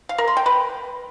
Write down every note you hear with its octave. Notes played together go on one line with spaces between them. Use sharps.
F5
A#4
C6
G5
B4